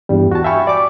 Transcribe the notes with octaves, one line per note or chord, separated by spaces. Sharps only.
E2 G2 G3
F#4 A5
E5 F5 G5 G#5 B5 C#6
D5 D6